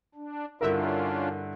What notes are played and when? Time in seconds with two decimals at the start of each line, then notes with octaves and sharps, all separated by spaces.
0.15 D4
0.61 G2 D3 C#4 D4 E4 F4 A#4 E5